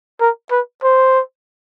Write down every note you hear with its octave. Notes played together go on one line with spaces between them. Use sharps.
A#4
B4
C5